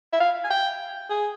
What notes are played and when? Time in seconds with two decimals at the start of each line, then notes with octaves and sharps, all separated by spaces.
0.13 E5
0.20 F5
0.44 G#5
0.50 G5
1.10 G#4